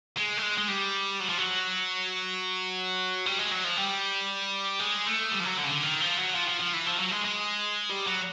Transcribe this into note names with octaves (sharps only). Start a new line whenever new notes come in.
G#3
A3
G#3
G#3
G3
F#3
F3
F#3
G3
G#3
F#3
F3
G3
G#3
A3
G3
F3
F#3
D3
C#3
D3
D#3
F3
F#3
F3
F3
F3
E3
F3
F#3
G#3
G#3
G3
F#3